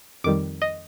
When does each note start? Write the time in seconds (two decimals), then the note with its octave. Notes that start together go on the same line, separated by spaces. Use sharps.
0.24 F2 D#3 G3 D6
0.62 D#5